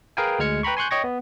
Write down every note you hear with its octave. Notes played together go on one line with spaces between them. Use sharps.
G#4 A#4 B4 F5 G5 G#5
D2 G#3 F6 G#6 C#7
B4 G5 A#5 B5 C#6
G#5 C6 C#6 F#6 G6
C#5 D#5 G5 C#6 G#6 A#6
B3